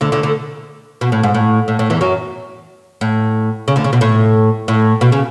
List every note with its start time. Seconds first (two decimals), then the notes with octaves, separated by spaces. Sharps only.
0.01 D2 D3
0.12 D2 D3
0.23 D2 D3
1.01 B2
1.12 A2
1.23 G#2
1.34 A2
1.68 A2
1.79 A2
1.90 E2 E3
2.01 F#2 F#3
3.01 A2
3.68 C#3
3.76 D2 D3
3.84 C#3
3.93 B2
4.01 A2
4.68 A2
5.01 B2
5.12 C#3